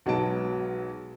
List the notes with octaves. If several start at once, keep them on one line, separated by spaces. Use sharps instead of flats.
B1 F#3 G#3 B3 A5 D7